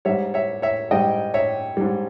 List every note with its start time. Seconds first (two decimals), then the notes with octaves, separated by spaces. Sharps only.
0.05 G#2 G3 C#5 E5
0.34 C#5 E5
0.62 C#5 E5
0.91 G#2 G3 D#5 G5
1.34 C#5 E5
1.77 G#2 G3